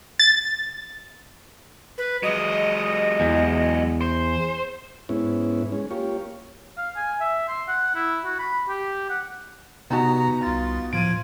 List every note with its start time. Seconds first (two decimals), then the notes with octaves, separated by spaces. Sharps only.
0.19 A6
1.98 B4
2.23 F#3 G#3 D#5
3.20 E2
4.01 C5
5.09 G#2 B3 C#4 E4
5.72 G#3 C#4
5.91 A#3 F4 G4 C#5
6.78 F5
6.96 G#5
7.20 E5
7.48 C6
7.68 F#5
7.95 E4
8.25 F#4
8.39 B5
8.69 G4
9.10 F#5
9.90 C3 B3 D#4 F#4 A#5
10.43 C2 F4 A6
10.93 A2 F3 F4 G#6 D7 D#7